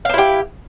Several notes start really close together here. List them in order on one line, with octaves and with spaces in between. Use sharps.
F5 C5 E4 G4